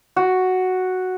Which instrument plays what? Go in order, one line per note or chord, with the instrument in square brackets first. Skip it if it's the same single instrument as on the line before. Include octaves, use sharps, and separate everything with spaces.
[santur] F#4